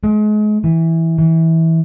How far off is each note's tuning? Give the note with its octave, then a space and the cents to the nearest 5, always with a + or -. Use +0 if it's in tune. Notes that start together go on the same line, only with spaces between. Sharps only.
G#3 +35
E3 -10
E3 -20